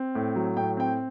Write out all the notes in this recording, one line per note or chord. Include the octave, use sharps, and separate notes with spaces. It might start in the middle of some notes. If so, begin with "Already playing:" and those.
Already playing: C4
A2
F#3
A2 G5
C4 G5